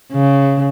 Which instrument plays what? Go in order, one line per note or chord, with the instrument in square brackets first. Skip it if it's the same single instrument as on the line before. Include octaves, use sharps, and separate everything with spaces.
[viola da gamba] C#3